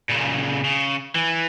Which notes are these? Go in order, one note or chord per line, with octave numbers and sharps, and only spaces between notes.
A#2 C#3
C#3
E3